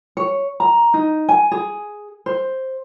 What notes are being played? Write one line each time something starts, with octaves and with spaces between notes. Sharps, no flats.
C#5
A#5
D#4
G#5
G#4
C5